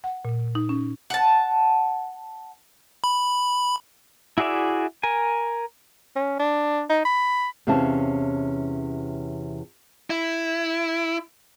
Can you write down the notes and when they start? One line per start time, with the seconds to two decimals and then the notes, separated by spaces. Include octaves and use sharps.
0.04 F#5
0.25 A#2
0.55 D#4
0.69 C#4
1.10 F#5 A5
3.04 B5
4.38 E4 F#4 G#4 D5 E5
5.03 A#4 G#5
6.16 C#4
6.39 D4
6.90 D#4
7.05 B5
7.67 E2 C3 E3 C#4 F5 A5
10.10 E4